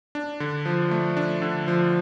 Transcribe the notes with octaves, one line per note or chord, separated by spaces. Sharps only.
D4
D3
F3
A3
D4
D3
F3